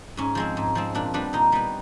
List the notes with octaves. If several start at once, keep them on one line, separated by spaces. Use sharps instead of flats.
G#2 C#4
F3 G#3 C4
G#2
F3 G#3 C4
A#2 D4
G3 B3 D4
A#2 D#4
G3 B3